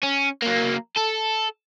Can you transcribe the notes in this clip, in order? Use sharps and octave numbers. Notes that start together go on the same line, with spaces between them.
C#4
F#3 A#3
A4